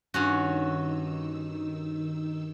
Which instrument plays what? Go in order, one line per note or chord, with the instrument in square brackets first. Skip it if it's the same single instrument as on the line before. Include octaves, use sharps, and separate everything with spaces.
[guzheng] G2 C#4 F#4 [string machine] D#3 D#4 E6